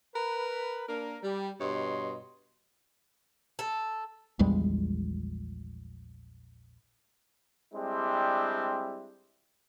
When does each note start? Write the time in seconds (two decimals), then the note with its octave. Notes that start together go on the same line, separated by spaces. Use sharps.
0.15 A#4 B4
0.89 A#3 D4 A#4
1.23 G3
1.61 G2 B2 C#5 D#5 C6
3.59 A4
4.39 A#1 E2 G3 G#3
7.74 G3 G#3 C4 D4 E4